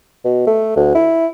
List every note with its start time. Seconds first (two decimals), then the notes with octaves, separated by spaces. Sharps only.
0.25 B2
0.47 A3
0.76 D2
0.95 E4